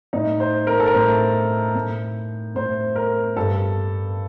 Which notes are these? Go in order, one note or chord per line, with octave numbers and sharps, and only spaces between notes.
A2 D#4
C5
A#4
A4
A#4
A2 C5
A2
A2 C5
A#4
G2 A4